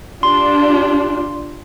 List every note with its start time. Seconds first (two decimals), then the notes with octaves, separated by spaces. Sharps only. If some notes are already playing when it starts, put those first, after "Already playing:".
0.23 D4 F4 G4 C6